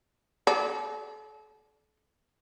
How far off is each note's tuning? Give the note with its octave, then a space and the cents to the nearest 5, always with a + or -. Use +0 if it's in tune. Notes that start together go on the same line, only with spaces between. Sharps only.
A4 -40 D5 +0